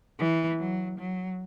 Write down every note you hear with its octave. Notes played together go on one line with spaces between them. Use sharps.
E3
F#3
F#3